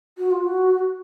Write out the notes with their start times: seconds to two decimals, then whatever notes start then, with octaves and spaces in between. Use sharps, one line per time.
0.18 F#4
0.31 F4
0.44 F#4